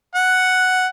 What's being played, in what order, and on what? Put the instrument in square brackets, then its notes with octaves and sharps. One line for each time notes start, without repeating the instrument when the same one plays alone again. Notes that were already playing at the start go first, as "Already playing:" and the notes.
[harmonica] F#5